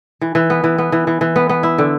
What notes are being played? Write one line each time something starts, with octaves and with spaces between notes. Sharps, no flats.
E3
E3
B3
E3
B3
E3
E3
E3
B3
B3
E4
D3